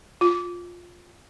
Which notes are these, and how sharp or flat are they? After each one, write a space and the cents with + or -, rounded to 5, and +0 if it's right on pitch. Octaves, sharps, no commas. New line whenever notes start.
F4 +10